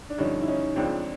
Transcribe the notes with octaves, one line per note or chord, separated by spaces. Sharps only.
D4
G2 D3 F3 C#4 D#4
E4
C#4 D#4
C#2 C#3 F3 C4 D4